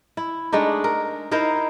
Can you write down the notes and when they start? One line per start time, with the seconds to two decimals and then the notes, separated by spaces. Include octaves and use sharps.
0.17 E4
0.52 G#3 A3 D4 D#4
0.84 A#4
1.31 D#4 E4 A#4 C5